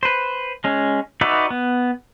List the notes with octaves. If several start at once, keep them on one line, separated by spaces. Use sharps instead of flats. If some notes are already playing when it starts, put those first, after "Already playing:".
B4 C5
G#3 C#4
D#4 F#4 B4 D5 E5
B3